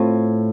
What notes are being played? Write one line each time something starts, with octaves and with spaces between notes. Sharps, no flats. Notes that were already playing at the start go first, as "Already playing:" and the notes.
Already playing: A2 A3 C4 F4